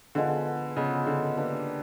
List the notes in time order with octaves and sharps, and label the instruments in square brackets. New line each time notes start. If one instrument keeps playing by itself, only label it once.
[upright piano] D3 [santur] F3 G#3 B3
[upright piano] C#3 [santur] F3 G#3 B3
[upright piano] D3
[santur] A#3 D4 G4 B4